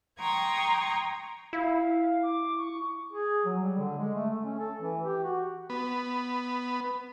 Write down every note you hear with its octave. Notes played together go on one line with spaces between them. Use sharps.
G5 A#5 C6 C#6 D#6 G#6
E4 F5
D6
C#6
G#4
F#3
G3
D3
G#3
A3
A3
C#4
A4
E3
G4
F#4
B3